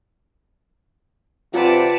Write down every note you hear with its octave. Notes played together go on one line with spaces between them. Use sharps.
C3 F4 B4 D5 F#5 A5